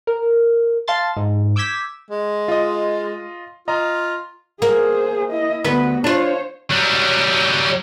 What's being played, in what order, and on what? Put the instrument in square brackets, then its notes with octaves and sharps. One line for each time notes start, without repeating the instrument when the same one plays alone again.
[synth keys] A#4
F5 A5 C6 A6
G#2
D6 E6 G6 G#6 B6 E7
[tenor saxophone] G#3
[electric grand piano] F4 D#5
[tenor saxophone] F4 [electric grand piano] D#5 A#5
[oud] A#3 [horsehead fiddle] G#4 C5
[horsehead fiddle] E4 D#5
[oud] D2 B4 [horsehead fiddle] B3 F#4
[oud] D4 F4 [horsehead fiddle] C5 C#5
[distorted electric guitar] F#3 G3